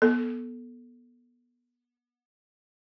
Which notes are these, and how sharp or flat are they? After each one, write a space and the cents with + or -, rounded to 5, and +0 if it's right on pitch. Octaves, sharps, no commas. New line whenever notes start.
B3 -25 A4 +0